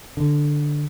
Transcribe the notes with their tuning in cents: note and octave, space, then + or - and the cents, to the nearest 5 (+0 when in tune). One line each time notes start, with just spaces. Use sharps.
D3 +5